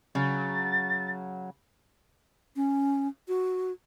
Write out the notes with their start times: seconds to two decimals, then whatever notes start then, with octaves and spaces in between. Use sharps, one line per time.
0.15 C#3 F#3 A6
2.56 C#4
3.28 F#4